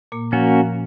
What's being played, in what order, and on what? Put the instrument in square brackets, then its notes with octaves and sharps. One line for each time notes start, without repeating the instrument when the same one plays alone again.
[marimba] A#2 A#3
[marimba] F3 [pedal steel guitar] A#3 C#4 F#4